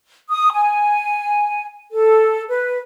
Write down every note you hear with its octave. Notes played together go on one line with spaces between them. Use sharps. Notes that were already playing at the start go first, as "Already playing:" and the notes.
D#6
G#5
A4
B4